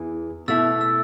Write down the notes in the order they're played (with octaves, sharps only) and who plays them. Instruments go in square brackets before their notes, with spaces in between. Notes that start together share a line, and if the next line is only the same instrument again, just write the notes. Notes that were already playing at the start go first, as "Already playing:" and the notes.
Already playing: [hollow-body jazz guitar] E2 E3
[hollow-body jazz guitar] B2 A3 E4 [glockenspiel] E6 A6
[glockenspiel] E6